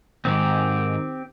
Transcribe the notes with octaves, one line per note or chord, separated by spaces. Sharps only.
D2 G#2 D#3 C4 G4